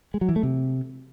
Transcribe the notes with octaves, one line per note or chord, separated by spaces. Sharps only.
G#3
F#3
E3
A3
C3